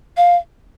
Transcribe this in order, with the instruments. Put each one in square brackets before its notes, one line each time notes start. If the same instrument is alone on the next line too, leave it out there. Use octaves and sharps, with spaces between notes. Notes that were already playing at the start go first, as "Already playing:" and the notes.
[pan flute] F5